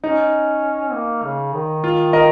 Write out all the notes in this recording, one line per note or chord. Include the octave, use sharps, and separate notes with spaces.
C#4 D#4
A#3
C#3
D#3
F4
A#4 D#5